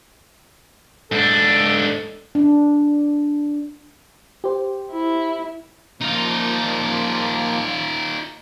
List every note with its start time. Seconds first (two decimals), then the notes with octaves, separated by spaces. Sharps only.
1.12 G#2 D4 A4
2.35 D4
4.44 G4 C5
4.92 E4
6.01 F3 A#3 D#4 F4